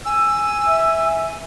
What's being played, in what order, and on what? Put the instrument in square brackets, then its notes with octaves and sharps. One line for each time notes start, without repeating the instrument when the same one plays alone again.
[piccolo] G#5 [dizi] E6
[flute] E5